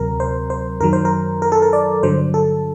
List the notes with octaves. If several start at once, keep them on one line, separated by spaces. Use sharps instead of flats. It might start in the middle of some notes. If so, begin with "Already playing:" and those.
Already playing: D2 C3 F#3 A#4
C5
C5
F#2 D#3 F#3 A#4
C5
A#4
A#4
A4
A#4
D5
G2 D3 F#3 C5
A4